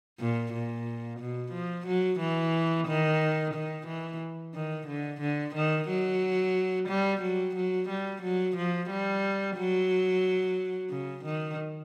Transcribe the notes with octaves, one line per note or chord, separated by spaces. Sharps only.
A#2
A#2
B2
F3
F#3
E3
D#3
D#3
E3
D#3
D3
D3
D#3
F#3
G3
F#3
F#3
G3
F#3
F3
G3
F#3
C#3
D#3